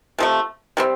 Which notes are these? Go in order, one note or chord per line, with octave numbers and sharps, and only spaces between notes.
C3 F3 A3
C3 G3 C4